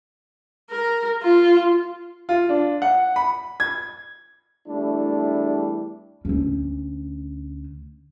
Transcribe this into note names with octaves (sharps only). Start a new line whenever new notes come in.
A#4
F4
F4
D4
F#5
B5
G#6
E2 G3 A3 D4 E4
D2 C#4